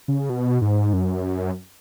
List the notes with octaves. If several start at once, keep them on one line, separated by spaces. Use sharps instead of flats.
C#3
B2
G#2
F#2